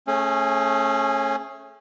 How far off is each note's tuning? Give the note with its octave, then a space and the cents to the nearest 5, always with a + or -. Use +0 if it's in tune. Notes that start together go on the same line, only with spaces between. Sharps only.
A3 +0 C#4 -20 G#4 +20